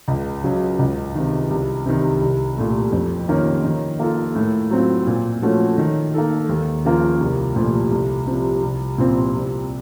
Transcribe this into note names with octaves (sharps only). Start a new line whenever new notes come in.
C#2
C#3 F#3
C#2
C3 D#3
C2
C3 D#3
C2
A#2 A3
F2
D#3 A#3 C#4 F4
D#3
A#3 F4 A4
A2
F#3 C4 F4
A#2
F3 A3 C#4 F#4
D#3
A#3 D#4 A4
D#2
C#3 F3 A#3 F4
C2
A#2 F3 A3
C2
C3 F3
C2
A#2 F3 C4
C2